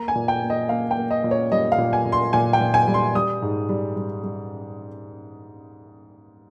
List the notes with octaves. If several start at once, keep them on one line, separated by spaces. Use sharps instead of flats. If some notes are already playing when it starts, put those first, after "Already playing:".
Already playing: A#3 A#5
G#5
A#2
G5
A#3
D#5
A#3 F5
G5
A#3
D#5
A#2
C#5
G3 D#5
F5
A#2
G#5
A#2
C6
A#2 G#5
G5
A#2
G#5
G3
C6
G3 D#6
G#2
G3
G3
G3